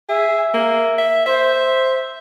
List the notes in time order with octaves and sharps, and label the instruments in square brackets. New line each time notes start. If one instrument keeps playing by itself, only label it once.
[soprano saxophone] G#4 [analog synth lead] E5
[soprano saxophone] A#3
E5
[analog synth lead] C5 [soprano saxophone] E5